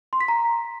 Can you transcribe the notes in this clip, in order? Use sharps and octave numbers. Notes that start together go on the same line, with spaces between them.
C6
B6
A#5